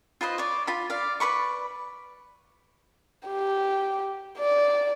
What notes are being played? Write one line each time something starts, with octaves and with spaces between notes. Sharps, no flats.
F4 B4 C5 D#5
C#5 D5
F4 B5
D5 F5
B4 D5 B5 C#6
G4
D5